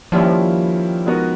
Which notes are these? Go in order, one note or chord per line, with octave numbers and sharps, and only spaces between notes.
D#3 F3 G3 A#3 C#4 E4
G#3 B3 D#4 F#4 A#4